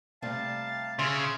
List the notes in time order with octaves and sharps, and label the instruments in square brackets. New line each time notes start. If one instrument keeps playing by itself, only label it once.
[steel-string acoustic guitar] C3 G3 A3 [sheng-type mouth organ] F5 A5
[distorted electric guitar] C#3 [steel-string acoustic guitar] C#5 [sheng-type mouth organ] E5 F6 [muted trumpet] C6